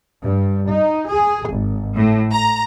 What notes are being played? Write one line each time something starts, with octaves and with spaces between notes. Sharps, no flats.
G2
D#4
G#4
G#1
A2
A#5